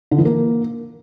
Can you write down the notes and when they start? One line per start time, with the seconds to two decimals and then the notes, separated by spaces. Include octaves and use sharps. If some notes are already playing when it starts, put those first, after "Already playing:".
0.11 D3
0.18 E3
0.25 A#3